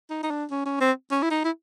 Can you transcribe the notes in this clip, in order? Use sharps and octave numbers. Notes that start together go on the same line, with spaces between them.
D#4
D#4
D4
C#4
C#4
C4
C#4
E4
D#4
E4